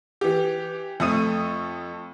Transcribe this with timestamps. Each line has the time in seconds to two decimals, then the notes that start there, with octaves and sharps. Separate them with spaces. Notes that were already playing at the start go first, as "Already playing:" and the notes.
0.21 E3 G4
1.00 F2 A3 D#6 D#7